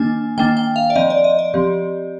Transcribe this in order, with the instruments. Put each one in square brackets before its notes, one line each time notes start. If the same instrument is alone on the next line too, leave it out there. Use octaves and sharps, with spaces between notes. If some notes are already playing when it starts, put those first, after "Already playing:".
Already playing: [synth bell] D#3 A#3 D4 G#5
D#3 A#3 D4 G5
G5
F5
D5
F3 C4 D#5
D5
D#5
D5
F3 C4 G4